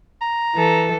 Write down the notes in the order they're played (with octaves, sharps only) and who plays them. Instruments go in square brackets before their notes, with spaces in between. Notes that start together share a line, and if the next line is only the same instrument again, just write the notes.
[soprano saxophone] A#5
[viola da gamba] E3 A4